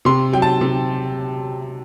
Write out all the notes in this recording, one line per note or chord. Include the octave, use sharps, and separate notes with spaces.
C3 C6
F#3 G5
A5
C3